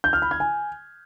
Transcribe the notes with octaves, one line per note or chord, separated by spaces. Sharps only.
G6
F6
B5
G#6
G#5